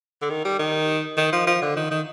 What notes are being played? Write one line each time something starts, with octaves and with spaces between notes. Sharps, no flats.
D3
D#3
G3
D#3
D#3
F3
F3
D3
D#3
D#3